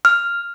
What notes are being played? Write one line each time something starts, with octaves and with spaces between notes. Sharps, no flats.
F6